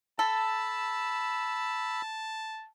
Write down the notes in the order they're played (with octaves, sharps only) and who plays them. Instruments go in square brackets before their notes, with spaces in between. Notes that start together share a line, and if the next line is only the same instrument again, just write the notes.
[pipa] A4 [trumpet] A5 [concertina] B5 E6